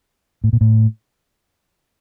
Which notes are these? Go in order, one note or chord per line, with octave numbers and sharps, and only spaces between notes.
A2
A#2
A2